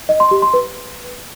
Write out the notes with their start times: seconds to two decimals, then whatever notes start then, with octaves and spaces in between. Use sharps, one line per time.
0.09 D#5
0.20 C6
0.31 G4
0.42 C6
0.54 B4